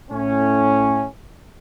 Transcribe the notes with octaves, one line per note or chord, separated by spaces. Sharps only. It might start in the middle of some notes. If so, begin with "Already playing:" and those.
A2 C#4